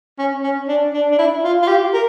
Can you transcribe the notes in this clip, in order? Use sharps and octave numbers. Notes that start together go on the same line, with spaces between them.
C#4
C#4
D4
D4
D4
E4
F4
F4
G4
A#4